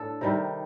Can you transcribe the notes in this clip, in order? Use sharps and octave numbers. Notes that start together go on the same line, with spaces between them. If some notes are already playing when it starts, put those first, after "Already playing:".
Already playing: A2 D4 A4
C3 D#3 G3